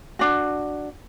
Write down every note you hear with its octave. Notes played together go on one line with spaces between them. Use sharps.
D4 F#4